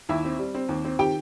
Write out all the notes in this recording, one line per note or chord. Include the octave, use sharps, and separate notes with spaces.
D#2 E4 E5
C4
G3
C4
D#2
C4
D#3 G4 G5